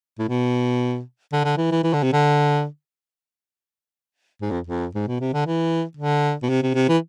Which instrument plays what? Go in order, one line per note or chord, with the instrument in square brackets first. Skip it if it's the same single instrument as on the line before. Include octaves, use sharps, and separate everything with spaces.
[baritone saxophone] A2
B2
D3
D3
E3
E3
E3
D3
C3
D3
G#2
F2
F2
G#2
B2
C3
D3
E3
D3
B2
C3
C3
C3
E3